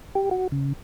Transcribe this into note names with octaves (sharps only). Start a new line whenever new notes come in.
G4
F#4
C#3